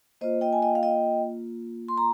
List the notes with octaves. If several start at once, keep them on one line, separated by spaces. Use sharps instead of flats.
A#3 F4 C5 D#5
D#5 G5
G#5
D#5 G5
F5
D#5 G5
C6
A#5